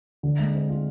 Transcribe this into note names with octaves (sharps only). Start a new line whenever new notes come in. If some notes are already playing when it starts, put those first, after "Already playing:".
D3
G#3
C4
F4